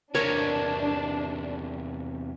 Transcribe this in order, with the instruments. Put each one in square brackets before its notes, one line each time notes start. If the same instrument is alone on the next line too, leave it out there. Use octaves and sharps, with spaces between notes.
[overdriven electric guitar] E2 C3 [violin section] D4 [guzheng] A#4 E5 A#5 [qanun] C#5